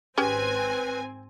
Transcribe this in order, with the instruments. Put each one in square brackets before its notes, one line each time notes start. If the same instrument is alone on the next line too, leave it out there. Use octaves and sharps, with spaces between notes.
[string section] G#1 C4 G#5 [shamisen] C#4 G4 G#4 [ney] B4